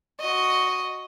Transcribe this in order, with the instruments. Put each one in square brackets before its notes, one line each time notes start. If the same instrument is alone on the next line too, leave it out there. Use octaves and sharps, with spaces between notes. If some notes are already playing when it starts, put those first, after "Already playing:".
[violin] F#4 D#5